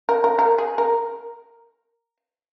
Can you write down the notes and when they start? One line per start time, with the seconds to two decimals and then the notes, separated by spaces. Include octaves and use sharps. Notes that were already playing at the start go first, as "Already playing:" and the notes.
0.09 A#4
0.24 A#4
0.39 A#4
0.58 G#4
0.78 A#4